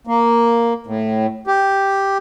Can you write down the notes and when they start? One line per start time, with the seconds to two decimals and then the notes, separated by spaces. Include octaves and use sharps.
0.07 A#3
0.87 A2
1.47 G4